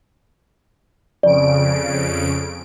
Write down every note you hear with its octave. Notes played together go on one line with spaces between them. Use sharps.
F2 C#3 D5 D7